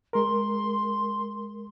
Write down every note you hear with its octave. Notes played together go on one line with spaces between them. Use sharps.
G#3 A#4 C6